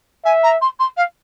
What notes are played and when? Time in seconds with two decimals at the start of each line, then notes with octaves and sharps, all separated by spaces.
0.25 E5 G#5
0.43 A#5
0.61 C6
0.79 C6
0.97 F5